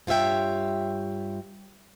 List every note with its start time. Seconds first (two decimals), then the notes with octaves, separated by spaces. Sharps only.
0.07 G2 F4 C#5 E5 G5